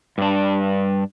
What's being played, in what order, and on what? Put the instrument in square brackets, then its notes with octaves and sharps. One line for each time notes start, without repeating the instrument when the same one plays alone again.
[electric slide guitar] G2 D4